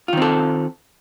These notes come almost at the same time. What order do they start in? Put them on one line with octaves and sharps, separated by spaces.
F4 D#3 C4 A4